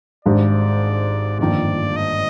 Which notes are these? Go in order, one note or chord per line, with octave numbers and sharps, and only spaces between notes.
G#1 G#2 G3 D4 D5
G1 F2 D#3 A#3 D4 D5
D#5